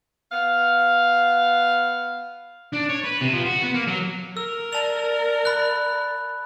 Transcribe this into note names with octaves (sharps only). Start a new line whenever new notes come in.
B3 F5
D4
C#5
B4
C3
F3
F#4
B3
A#3
F#3
A#4 E6
D5 A5 F7
B5 F#6